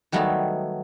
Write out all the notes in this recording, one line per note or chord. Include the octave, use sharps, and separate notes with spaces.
D#3 F#3 G3 A3 B3